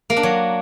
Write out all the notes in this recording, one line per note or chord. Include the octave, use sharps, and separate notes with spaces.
A#3
D4
F#3